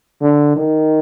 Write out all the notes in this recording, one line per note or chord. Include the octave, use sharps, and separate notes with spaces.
D3
D#3